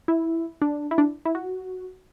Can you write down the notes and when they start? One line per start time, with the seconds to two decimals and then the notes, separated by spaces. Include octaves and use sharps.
0.08 E4
0.62 D4
0.91 E4
0.98 D4
1.25 E4
1.35 F#4